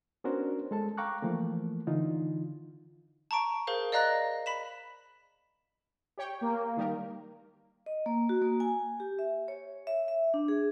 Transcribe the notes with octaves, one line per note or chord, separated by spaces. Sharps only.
B3 C#4 D4 F#4 A#4 C5
G#3 A4 A5
F5 G5 A#5 C#6 D6 F#6
E3 F3 A3 A#3
D3 E3 D#4 F4
A5 A#5 C#6 D7
G#4 A#4 C5 F5
D5 D#5 F5 A#5 F#6 A#6
B5 B6 E7
G4 C#5 G5
A#3
D#3 G3 A#4
D#5
A#3
F#4
A#3
G#5
G4
E5
C#5
E5
E5
D4
G#4